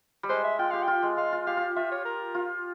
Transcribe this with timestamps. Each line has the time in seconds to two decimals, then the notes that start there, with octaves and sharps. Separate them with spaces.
0.23 G3
0.29 G#3 C5
0.44 E5
0.59 F4 G5
0.71 G4 F5
0.83 F4 G5
1.03 G#3
1.17 G#3 F5
1.32 F4
1.47 G4 F5
1.57 F4
1.76 F4 E5
1.92 C#5
2.05 A#4
2.35 F4